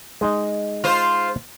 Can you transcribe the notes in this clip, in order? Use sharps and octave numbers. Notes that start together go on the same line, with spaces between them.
G#3 D#4 D#5
F4 C5